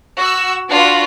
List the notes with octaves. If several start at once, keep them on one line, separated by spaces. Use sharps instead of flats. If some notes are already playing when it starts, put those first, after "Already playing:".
F#4 E6
D4 F4 F#4 B4